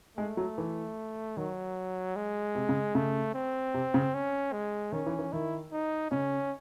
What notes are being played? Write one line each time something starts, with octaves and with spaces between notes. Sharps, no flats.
G#3 A3
F#3
E3
D#3 F#3
G#3
C3
C#3
C#3 A3
C4
C3
C#3
C#4
G#3
D#3 C#4
E3
E3
D#3 E4
D#4
C#3 C#4